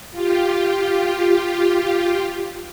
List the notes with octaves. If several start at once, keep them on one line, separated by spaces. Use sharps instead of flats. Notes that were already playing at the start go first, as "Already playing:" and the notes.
F4 G4